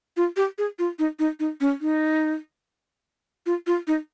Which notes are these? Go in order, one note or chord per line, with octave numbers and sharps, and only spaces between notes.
F4
G4
G#4
F4
D#4
D#4
D#4
C#4
D#4
F4
F4
D#4